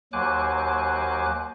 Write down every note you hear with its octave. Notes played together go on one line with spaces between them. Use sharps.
D#2 F#3 C5 G#5 D6 F#6